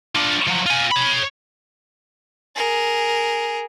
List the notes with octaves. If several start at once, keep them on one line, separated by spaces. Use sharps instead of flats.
D4 F4
F3 F#3
F4 G#5
C#5 B5
G#4 A#4